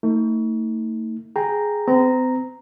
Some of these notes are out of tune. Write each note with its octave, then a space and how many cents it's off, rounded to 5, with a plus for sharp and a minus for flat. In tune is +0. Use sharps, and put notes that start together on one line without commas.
A3 +40 D#4 +35
G#4 +5 G5 +0 A#5 +0
C4 -40 A#5 +0